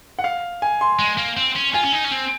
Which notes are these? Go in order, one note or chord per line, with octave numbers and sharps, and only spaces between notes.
F#5
F5
G#5
C6
G#3
A#3
C4
C#4
F4 G#5
C#4
D#4
C#4
C4